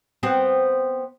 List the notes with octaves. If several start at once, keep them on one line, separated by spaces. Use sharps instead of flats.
B3 C4 F#4